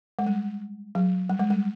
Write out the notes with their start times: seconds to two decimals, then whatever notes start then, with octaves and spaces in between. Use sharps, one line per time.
0.19 G#3
0.26 G3
0.95 F#3
1.29 G3
1.39 G#3
1.50 G3